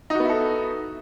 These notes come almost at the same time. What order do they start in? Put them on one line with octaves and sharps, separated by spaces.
D#4 F#4 B3 E4 A4